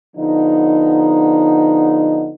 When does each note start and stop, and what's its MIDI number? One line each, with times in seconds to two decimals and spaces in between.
0.16 2.32 50
0.16 2.32 53
0.16 2.32 59
0.16 2.32 63